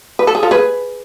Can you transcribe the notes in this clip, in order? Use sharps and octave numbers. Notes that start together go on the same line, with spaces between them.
B4
A4
G#4
F4 A4
G#4 B4